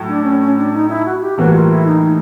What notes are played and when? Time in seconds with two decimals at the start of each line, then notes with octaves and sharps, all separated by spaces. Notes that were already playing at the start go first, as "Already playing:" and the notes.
Already playing: A2 F#3
0.08 D4
0.24 C#4
0.40 C#4
0.57 D4
0.73 D#4
0.89 E4
1.05 F#4
1.21 G4
1.38 A2 E3 G3 A#3 F#4
1.54 F4
1.70 E4
1.86 D#4